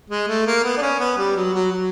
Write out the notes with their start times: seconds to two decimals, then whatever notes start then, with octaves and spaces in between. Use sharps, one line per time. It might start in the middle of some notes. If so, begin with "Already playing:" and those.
0.10 G#3
0.28 A3
0.47 A#3
0.64 B3
0.77 D4
0.82 C#4
1.00 B3
1.18 G3
1.36 F#3
1.54 F#3
1.72 F#3